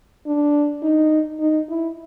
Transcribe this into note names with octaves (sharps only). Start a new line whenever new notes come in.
D4
D#4
D#4
E4